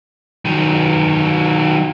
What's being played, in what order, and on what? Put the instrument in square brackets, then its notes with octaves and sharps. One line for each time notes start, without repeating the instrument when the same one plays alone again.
[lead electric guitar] D#3 F#3